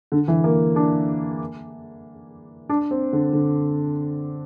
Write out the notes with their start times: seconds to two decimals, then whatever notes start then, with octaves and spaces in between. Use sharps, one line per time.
0.12 D3
0.28 E3
0.44 A#3
0.76 D4
2.69 D4
2.91 C4
3.13 D3
3.33 D3